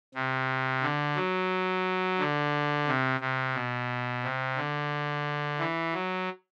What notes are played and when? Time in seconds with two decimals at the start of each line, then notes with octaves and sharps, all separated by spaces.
0.14 C3
0.82 D3
1.16 F#3
2.18 D3
2.87 C3
3.20 C3
3.55 B2
4.23 C3
4.57 D3
5.59 E3
5.94 F#3